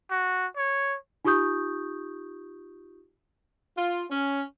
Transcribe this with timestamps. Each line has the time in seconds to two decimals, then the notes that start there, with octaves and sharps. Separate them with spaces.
0.11 F#4
0.57 C#5
1.25 D#4 F4 G4 C#6 D#6 G6
3.77 F4
4.10 C#4